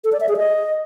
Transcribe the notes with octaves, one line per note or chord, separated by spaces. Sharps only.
A4
D5
E5
G#4
D#5